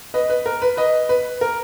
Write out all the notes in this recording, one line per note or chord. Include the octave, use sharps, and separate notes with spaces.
B4 D#5
B4
A#4
B4
B4 D#5
B4
A#4